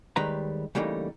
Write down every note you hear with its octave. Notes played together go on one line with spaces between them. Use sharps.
D#2 D#3 G3 G#3 B4 A#5
C#3 E3 G3 A3 A#3 D#4